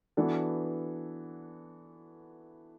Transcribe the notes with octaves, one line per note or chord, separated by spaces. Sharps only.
E3 B3 D4 F#4 A4